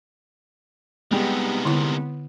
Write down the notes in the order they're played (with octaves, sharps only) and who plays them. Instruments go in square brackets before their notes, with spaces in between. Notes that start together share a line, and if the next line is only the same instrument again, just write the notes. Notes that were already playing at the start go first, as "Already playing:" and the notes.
[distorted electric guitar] C3 D#3 [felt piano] G3 G#3 [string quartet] B3
[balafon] D3 E4 C6